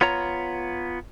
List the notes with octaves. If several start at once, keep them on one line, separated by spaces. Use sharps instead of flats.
B3 F4 C#5 A#5